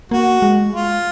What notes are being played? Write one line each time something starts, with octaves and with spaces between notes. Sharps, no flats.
A#3 F#4
G#3
F4